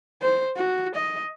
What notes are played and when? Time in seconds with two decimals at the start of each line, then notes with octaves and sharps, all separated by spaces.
0.22 C5
0.57 F#4
0.95 D#5